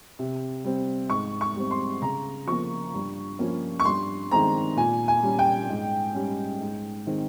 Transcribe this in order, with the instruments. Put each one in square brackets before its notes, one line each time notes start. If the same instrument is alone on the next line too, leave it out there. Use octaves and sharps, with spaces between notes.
[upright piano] C3
G3 C4
G#2 C#6
C#6
G3 C4
C6
C#3 A#5
F3 A#3 C#6
G2
F3 A#3 C#4
C#6
G2 C6
D#3 G#3 C4 A#5
A#2 G#5
G#5
G3 C#4
G5
G#2
G3 C#4
G#2
D#3 G#3 C4